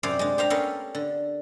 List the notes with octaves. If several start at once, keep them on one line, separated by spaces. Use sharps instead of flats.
F#2 C3 C5 D5 F5
G#3 D4
G4 C5 F5 A#5
B3 C#4 A4 A#4 F5
D3